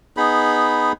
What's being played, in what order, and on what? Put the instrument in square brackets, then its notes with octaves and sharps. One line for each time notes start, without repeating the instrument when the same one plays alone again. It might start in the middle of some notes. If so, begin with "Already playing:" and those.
[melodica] B3 D#4 G#4 B5